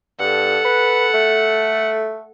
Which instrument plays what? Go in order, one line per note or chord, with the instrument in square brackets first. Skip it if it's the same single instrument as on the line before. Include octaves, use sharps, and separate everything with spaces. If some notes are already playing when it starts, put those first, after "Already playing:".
[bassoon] G2 [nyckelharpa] A4 F#5
[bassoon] B4
A3